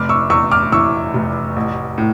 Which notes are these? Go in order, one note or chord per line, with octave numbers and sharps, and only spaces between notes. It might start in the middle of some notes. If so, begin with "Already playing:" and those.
Already playing: F1 D6 F6
C#6 E6
E2 C#6 E6
D6 F6
E3 C#6 E6
F1
A1
A2